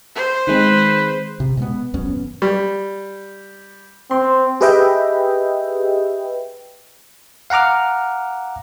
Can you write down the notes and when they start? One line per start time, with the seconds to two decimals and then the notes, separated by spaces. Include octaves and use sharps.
0.15 C5
0.47 D#3 G#3 C4 B4
1.40 C3
1.57 B2 G#3 B3
1.94 D#1 F#2 B3 C#4
2.42 G3
4.11 C4 C6
4.61 G4 G#4 B4 D#5 E5 G5
7.50 F5 F#5 A#5 D6 F6